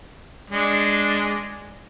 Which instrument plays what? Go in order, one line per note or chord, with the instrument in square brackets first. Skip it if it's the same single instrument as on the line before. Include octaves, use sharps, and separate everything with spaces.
[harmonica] G#3 D4